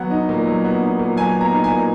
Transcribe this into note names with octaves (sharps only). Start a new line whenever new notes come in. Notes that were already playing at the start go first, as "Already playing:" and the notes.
Already playing: F#3 B3 F#5
D#4
A#2
F#3
B3
D#4
A#2
F#3 G#5
B3
A#5
D#4
G#5
A#2